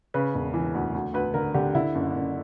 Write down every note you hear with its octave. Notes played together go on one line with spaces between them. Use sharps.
C#3 B4
E1
E3
D2
D2
D2 B4
D3 A#4
D3 G4
D3 E4
F#1
F#1